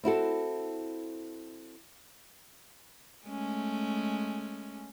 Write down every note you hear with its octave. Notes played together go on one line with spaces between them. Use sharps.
C4 E4 F#4 A4
G#3 A3 C#4